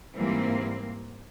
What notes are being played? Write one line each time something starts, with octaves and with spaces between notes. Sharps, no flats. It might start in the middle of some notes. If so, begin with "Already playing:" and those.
G#2 E3 G3 A#3 C4